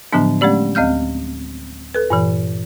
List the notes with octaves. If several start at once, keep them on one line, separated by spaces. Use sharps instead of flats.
A2 D3 F3 F#3 B3 D4
G#3 A3 C#4 G4 D5
D2 C4 F5 F6 G6
A4 B4
G2 A#2 E3